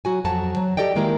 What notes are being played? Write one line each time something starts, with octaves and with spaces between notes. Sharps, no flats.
F#3 F#4 G#5
F2 F#3 F#4 A5
F#3
G4 A4 D5 D#5 G5
D#3 G#3 A#3 E4 A#4